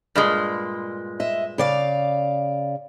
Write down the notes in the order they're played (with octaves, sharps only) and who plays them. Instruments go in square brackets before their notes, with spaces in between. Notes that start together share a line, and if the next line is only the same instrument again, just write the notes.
[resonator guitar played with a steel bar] G2 A#2 G#3
[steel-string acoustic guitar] D#5 E5
C#3 D5 F5